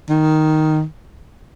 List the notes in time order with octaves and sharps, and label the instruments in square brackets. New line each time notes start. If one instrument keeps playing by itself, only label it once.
[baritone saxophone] D#3